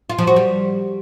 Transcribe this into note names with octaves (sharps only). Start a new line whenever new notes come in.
F4
F3
F#4
G3